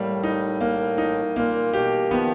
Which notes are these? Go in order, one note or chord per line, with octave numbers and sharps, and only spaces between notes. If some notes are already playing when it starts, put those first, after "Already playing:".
Already playing: A2 G3 A#3
D#4
A#3
D#4
A#2 A#3
B2 G4
D#3 F3 B3